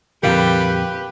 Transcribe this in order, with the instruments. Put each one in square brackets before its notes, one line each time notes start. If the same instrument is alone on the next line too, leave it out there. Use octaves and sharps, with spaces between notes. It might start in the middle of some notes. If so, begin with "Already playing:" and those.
[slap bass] F2 A#2 D3 [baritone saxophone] G3 [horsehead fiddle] G4 B4 [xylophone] A#4 F5